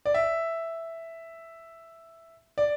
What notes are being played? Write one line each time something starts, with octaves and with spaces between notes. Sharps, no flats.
D5
E5
D5